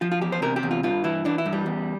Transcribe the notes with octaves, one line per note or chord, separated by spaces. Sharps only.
F3 F4
F4
E2 G4
C5
C3 A#4
G4
E2
F4
G2 F4
E3 E4
E3 D4
E4
G2
G3
E2